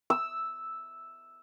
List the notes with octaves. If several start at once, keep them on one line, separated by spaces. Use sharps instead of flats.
E6